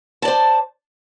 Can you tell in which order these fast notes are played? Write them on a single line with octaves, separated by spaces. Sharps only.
A5 D5 C5